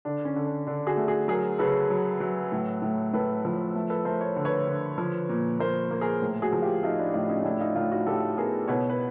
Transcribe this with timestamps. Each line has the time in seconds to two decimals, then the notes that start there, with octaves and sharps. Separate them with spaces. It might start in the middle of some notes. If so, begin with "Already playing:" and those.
0.05 D3 D4
0.25 C#4
0.36 D3
0.47 D4
0.67 D3 D4
0.87 F#4 G#4
0.97 A3
1.08 F#4 G#4
1.28 F#3 G#4 A#4
1.59 C#3 A4 B4
1.90 F#3
2.20 F#3
2.52 A2
2.82 A2
3.13 A2 A4 B4
3.45 F3
3.76 A3
3.90 A4 B4
4.05 A3 A#4 C5
4.21 C#5
4.36 D3
4.45 B4 C#5
4.67 D3
4.98 F3
5.29 A#2
5.59 A#2 A#4 C5
5.91 A#3
6.01 G#4 A#4
6.22 A2
6.42 F#4 G#4
6.52 F3
6.62 F4 G4
6.83 A3 D#4 F4
6.99 D4 E4
7.14 A2 D#4 F4
7.29 C#4 D#4
7.44 A2 D4 E4
7.61 D#4 F4
7.75 A2 D#4 F4
7.91 E4 F#4
8.07 A2 G4 A4
8.37 B3 G#4 A#4
8.68 B2 B4 C#5
8.90 B4